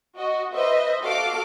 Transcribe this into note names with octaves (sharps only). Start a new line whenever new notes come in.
F#4 D#5
B4 C5 D#5 E5
F#4 A4 F5 D6